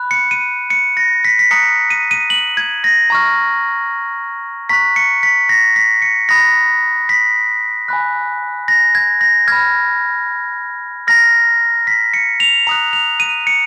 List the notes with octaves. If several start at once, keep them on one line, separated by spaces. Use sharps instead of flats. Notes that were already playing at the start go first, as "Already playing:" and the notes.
Already playing: B5 F#6
C#7
D#7
C#7
A#6
B6
B6
A#5 D#6 F#6 C#7
D#7
D#7
F#7
G#6
A#6
A#5 C#6 F6
A#5 C#6 F#6 B6
C#7
B6
A#6
B6
C#7
B5 D#6 F#6 A#6
B6
G#5 B5 F#6
A#6
G#6
A#6
B5 F6 G#6
A#5 F6 A#6
B6
C#7
F7
A#5 D#6 F#6
F7
D#7
C#7